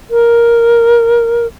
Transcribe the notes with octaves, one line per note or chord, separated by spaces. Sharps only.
A#4